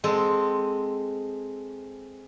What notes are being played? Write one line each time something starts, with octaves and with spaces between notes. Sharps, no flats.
G#3 C4 A4